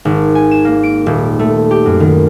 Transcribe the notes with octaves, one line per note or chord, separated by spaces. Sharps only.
G#1
G#5
E7
A#3
D7
D#1
A3
G4
F#2
D#3